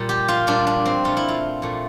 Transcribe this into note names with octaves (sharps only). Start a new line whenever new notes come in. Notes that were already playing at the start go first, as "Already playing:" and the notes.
Already playing: A#2 G3
G4
F4
A#2 G3 D4
D4
C4
A#2 A3 F4
E4
F4
A#2 A3